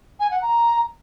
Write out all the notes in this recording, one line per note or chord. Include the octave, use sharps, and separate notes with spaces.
G#5
F#5
A#5